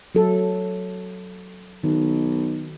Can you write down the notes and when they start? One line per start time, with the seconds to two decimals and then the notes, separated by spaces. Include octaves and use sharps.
0.15 F#3 A4
1.84 B1 D#3